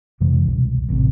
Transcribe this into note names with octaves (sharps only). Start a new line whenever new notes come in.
F2 C3 E3 G#3
E1 C2
A1 C3